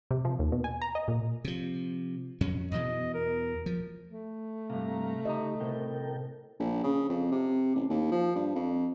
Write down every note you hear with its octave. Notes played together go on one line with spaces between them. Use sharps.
C3
F3
D#2
B2
G#5
A#5
D#5
A#2
C3 F3
F2 F#3 C#4
E2 B2 E3 D#5
A#4
F3
A3
G2 C3 F5 A#5
C#3 D#4 G4 D#5 E5 A#5
A2 C3 A4 A#4 G5
A#1
C#3
F2
C3
A1
D#2
F3
G2
F2